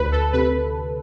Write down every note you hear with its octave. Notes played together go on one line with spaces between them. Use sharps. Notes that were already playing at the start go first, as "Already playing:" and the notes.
Already playing: D2 B4
A4
C3 B4